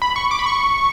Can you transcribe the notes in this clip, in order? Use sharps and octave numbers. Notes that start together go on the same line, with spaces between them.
B5
C#6
D6
B5
C#6